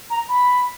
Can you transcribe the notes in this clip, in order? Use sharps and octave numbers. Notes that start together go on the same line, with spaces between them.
A#5
B5